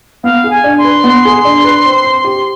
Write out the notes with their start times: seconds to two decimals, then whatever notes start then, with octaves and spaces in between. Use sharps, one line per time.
0.24 B3 F5
0.44 G#4
0.50 G#5
0.64 D4
0.78 C6
0.85 B4
1.04 B3
1.25 G#4
1.45 D4
1.64 B4
1.85 C4
2.04 C5
2.24 G4